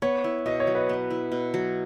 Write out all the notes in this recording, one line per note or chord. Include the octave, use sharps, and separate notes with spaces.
B3 C#5
E4
B2 D#5
C#5
F#3
B4
B3
E4
B2
F#3